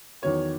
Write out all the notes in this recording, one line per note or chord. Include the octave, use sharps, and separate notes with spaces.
E2 D#3 F#3 C#5